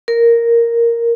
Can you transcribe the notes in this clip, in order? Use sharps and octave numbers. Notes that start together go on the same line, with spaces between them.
A#4